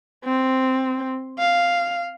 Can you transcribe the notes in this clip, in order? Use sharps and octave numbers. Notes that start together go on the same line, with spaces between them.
C4
F5